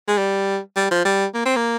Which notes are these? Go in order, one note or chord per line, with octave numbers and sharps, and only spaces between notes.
G#3
G3
G3
F3
G3
A#3
C4
A#3